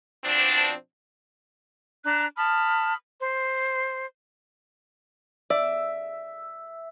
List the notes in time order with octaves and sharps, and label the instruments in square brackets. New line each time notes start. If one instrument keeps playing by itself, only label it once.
[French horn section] B2 F3 C4 D4
[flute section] D4 A#5 F#6
A5 B5 D#6 F6
C5
[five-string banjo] D5 [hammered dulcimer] E5